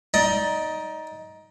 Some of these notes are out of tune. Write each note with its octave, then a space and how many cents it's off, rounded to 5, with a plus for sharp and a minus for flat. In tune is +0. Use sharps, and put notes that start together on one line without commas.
D#4 +15 D5 +0